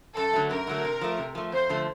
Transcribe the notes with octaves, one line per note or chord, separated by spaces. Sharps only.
F#2 A4
D3 F#3 A3
F#2 A#4
D3 F#3 A3
C3
F3 A3
C3
F3 A3
F2 C5
D3 F3 A3